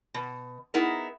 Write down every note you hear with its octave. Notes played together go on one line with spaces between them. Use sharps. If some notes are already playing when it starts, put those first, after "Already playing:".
B2
B3 D#4 E4 G#4 A#4